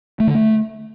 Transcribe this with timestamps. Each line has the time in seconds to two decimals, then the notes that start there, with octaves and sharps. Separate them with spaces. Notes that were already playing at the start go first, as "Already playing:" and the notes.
0.20 A3
0.27 D3
0.35 A3